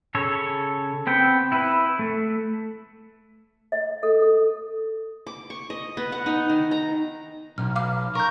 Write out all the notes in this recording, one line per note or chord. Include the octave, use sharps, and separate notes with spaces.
C#3 A4 C#5
B3 C4 G5
E4 B4
A3
D#5
A4
A4
D6
C#6
D#5
B3
F#5
D#4
D#3
A#5
B1 F6
F5 D6 F6
A#4 C#6 G6